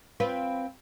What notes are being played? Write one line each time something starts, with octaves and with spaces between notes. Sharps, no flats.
C4 F4 B4